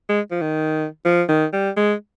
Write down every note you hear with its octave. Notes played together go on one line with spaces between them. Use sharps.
G#3
F3
D#3
F3
D#3
G3
G#3